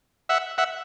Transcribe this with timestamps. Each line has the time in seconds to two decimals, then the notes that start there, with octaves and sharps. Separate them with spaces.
0.29 E5 F#5
0.58 E5 F#5